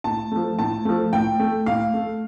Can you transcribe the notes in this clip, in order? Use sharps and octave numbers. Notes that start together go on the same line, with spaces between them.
A2 A5
F3 A3
A2 A5
F3 A3
A2 G5
A3
A2 F5
A3